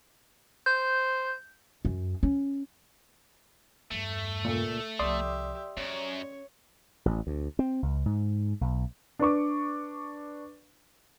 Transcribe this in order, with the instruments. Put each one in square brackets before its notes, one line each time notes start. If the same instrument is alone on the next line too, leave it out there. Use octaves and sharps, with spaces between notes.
[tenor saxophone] C5 [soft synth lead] G6
[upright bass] F#2
C#4
[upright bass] E2 G2 [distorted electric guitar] A3
[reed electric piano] C#2 A#2 [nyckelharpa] A4
[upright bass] C2 F3 [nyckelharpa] G4 E5 [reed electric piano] D5 C6 D#6
[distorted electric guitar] F#2 [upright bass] C#4 [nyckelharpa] C#5
[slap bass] A1
D2
C4
C#2
G#2
B1
[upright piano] D4 B4 C#6 D6